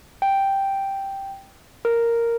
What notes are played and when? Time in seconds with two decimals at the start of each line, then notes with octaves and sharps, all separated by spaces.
0.22 G5
1.85 A#4